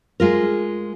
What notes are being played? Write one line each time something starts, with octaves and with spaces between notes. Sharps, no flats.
G#3 F4 A#4